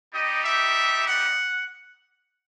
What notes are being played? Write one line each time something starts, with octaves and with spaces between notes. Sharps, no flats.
G3 D#4 G4 D#5
E5
F#5